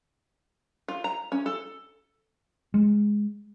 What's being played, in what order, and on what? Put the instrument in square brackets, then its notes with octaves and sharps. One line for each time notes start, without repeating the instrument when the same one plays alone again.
[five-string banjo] F4
A#5
C#4
A4
[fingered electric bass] G#3